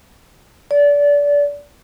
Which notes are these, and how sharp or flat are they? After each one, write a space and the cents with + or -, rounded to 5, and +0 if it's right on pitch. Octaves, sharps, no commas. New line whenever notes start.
D5 -25